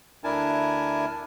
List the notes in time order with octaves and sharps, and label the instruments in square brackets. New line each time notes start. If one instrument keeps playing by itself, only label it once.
[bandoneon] D2 D4 E4 A#4 G#5 A5